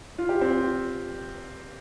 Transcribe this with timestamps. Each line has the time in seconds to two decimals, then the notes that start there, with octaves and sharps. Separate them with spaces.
0.18 F4
0.29 G4
0.41 C4 F4